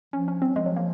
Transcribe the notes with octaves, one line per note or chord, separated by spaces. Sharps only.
F3 C#4
C#4
C4
F#3
F3 G#3
F#3
A#3